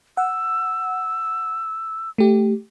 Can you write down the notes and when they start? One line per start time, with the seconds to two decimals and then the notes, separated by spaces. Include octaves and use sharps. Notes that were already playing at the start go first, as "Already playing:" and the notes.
0.17 F#5 E6
2.18 A3 G4